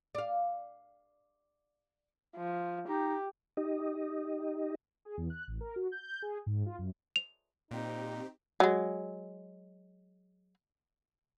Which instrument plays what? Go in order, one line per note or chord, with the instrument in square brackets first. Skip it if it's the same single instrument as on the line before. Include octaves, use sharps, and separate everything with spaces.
[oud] D5 F5
[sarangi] F3
[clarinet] D#4 [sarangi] G4
[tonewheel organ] D#4 G4 D#5
[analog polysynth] G#4
E2
F#6
A1
A#4
F#4
G6
G#4
G#2
F4
F#2
[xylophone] F7
[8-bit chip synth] A#2 [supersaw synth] C4 G4 [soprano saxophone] D#4
[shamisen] F#3 G#3